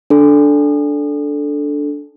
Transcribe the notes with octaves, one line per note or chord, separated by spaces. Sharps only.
D4 A4